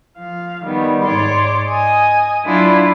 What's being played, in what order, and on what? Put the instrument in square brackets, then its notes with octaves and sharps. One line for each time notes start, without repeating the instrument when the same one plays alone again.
[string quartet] F3 F5
D#3 G3 B3
G#2 C#5 D5 C6 D6
D#5 G#5 D#6
F#3 D4 E4 F4